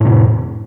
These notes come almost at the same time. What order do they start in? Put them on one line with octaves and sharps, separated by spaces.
A2 C3 F2